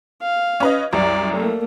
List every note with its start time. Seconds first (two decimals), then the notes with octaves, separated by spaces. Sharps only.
0.22 F5
0.60 C#4 B4 D#5
0.93 C2 F#2 D5
1.35 A3 A#3